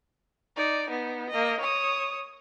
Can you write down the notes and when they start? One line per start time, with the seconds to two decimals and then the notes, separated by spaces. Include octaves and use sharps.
0.56 D#4 D5
0.89 B3 D#4
1.30 A#3 D#5
1.60 C#5 D#6